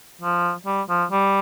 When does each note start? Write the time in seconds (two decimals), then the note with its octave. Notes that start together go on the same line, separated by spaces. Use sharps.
0.21 F3
0.66 G3
0.89 F3
1.12 G3